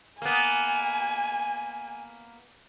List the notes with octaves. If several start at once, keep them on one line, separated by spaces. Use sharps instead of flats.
A#3 B3 G#5